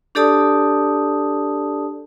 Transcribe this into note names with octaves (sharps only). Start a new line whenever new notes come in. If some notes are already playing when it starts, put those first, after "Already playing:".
D4 G4 A4 D5 A5 D#6